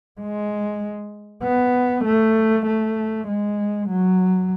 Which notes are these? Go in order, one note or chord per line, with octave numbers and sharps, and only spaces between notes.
G#3
B3
A3
A3
G#3
F#3